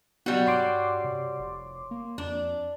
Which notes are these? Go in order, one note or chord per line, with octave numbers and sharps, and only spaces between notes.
B2 F#3 G3 E4 F#4
G2 C#5 C6 D6
C3
F1
A#3
F2 D4